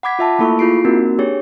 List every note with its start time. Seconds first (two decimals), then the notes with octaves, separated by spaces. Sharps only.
0.03 F#5 B5 D6 G#6 B6
0.19 F4 E5 A5
0.39 A3 A#3 E4 A4 B5 C#6
0.59 E4 F4 G#4 C7 D7
0.85 A#3 C4 D#4 F#4 A#4
1.19 D4 G4 G#4 C#5